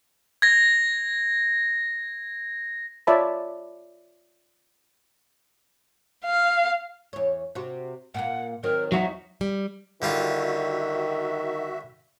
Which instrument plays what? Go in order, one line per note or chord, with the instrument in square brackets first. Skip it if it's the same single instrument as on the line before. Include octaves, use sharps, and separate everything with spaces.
[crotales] G#6 A#6
[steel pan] F4 C#5 D5 E5 A5 B5
[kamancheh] F5
[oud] E2 C#5
C3 F#4
[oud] A#2 A#3 [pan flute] F#5
[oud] D#3 F#3 C4 [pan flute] A#4
[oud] E2 D#4 [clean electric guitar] F#3 F#4 [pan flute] E5
[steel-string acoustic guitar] G3
[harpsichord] D3 G3 F4 [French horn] D#3 [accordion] F#4 E5